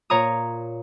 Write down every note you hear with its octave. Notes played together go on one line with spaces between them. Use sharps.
A#2 C#5 A#5 D#6